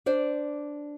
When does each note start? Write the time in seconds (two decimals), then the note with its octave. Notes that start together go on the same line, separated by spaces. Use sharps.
0.06 D4 C5 D5